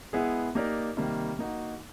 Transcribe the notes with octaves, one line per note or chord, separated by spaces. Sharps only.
G#3 B3 E4 G#4
A#3 D#4 G4 A#4 D5
C3 D#3 G3 A#3
A#3 D#4 F#4